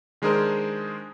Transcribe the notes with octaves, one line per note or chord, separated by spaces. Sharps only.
D#3 G#3 D4 G#4 A#4 C5